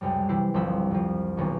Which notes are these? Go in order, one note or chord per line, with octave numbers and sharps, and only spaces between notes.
C#2 F#2 C3 G3
C3 E3 E4 G4 C7
G1 C2 F3 C5 E5 B5
F2 F3
D#1 B1 D#3